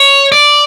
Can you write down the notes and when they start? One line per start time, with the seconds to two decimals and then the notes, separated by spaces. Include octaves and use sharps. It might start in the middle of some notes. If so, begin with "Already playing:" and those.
Already playing: C#5
0.32 D5